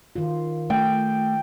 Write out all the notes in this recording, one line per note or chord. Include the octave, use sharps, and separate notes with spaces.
D#3 F4
A3 G5